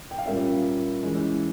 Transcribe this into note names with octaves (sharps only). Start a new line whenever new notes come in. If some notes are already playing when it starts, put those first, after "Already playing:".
G5
F5
A#2 G3 A#3 C#4 E5
E3 G#3 C#4